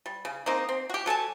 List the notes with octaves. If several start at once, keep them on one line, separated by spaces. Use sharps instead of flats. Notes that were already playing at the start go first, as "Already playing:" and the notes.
G3
C#3
A#3 C4 D#4
C4
F#4 G4
F#3 A4 G#5 A5